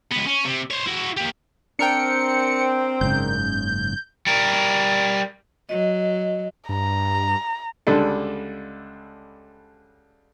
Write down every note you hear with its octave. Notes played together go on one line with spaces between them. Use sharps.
C#2 B3
C#4
C3
C5 C#5
E4 F#4
A#3 G4
C4 D4 A#4 G5 C#7
F#1 G#2 C#3 G6
G3 A#4
F#3 D#5
G2 A#5
C#2 D3 G3 D4 A4